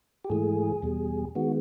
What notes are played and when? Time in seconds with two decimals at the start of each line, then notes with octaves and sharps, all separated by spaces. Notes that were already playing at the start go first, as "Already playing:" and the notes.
0.24 G4
0.30 G#2 E3 A3 G#4
0.82 E2 B2 G3
1.35 D#3 G#3 B3 F#4